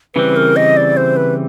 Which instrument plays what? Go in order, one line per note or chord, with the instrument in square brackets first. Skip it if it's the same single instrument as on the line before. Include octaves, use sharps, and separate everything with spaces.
[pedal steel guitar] C#3 E3 G3 C4 [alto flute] B4
[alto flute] A#4
D#5
D5
C5
B4